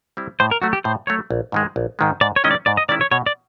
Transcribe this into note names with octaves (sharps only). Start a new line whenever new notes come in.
G3 C4 E4
A2 C5
A#4
F#3 A3 F#4
G4
A2 C5
F#3 A3 C#5
A#1
G#2 D#3 G#3
A#1
G#2 D#3 G#3
G#2 D5
C#5
D#3 G#3 C#4 E4 D#5
D5
G#2 D5
D#5
D#3 G#3 C#4 E4 D5
C#5
B2 C#5
D5